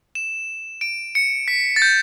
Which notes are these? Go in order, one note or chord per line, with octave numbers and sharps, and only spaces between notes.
E7
D7
C#7
B6
A6
G6